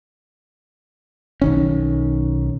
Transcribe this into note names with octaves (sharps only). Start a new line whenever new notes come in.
B1 D#3 C#4